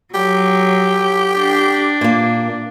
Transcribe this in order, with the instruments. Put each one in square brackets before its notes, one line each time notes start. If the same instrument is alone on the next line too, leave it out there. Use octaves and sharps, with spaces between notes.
[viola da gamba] F#3 [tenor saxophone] G4
[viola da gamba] D4
[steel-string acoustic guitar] A#2 A#3